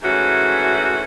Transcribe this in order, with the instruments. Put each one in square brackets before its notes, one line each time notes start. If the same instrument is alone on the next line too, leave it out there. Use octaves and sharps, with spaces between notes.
[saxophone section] G#2 E3 A3 C#4 F#4